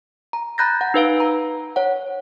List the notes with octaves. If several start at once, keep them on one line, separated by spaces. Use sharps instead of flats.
A#5
A#5 B5 F#6 G6 A6 A#6
F#5
D#4 B4 F5 D7
A#5
C#5 F#5